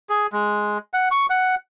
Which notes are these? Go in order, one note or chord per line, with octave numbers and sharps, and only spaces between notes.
G#4
G#3
F#5
C#6
F#5